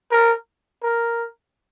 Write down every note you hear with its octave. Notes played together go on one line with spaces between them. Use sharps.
A#4
A#4